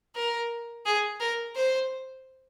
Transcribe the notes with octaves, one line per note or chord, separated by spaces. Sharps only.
A#4
G#4
A#4
C5